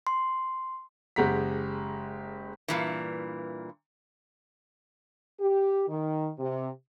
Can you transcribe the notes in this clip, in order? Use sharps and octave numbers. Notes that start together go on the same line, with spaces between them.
C6
F#1 G#3 G4 F#5 A#5 B6
G2 A#2 E3
G4
D#3
C3